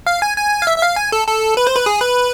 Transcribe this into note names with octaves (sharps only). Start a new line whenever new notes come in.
F5
G#5
G#5
F5
E5
E5
F5
G#5
A4
A4
B4
C5
B4
G#4
B4